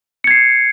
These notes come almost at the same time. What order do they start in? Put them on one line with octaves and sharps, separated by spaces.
C#7 G#6 C7